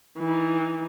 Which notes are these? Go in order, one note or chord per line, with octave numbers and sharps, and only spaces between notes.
E3 D#4